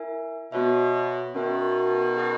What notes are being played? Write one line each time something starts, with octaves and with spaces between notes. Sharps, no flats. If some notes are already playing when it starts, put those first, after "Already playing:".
Already playing: E4 A#4 E5 G#5
B2 B3 F#4 C#5 E5
B2 D#3 C#4 F#4 A#4 E5
G#4 D#5 F#5